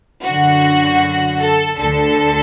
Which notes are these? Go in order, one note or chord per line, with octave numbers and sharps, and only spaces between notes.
F#2 D3 F#4
A4
D2 D3 A4